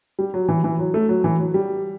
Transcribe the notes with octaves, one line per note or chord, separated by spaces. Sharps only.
G3
F#3
E3
E3
F#3
A3
F#3
E3
F#3
G3